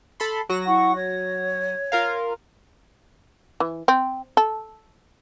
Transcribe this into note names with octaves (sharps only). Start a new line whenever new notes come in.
A4 B5 C6
F#3 F#4 A#6
E4 F#5 C#6
C#5
F4 A#4 F5
E3
C4
A4